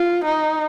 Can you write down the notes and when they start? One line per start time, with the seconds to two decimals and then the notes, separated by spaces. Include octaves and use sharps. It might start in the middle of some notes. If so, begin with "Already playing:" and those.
Already playing: F4
0.24 D#4